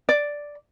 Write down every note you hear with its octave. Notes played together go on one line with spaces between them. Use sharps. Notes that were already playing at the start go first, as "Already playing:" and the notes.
D5